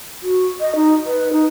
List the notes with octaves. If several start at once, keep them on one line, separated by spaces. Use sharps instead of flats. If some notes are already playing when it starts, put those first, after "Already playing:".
F#4
D#5
D#4
B4
D#4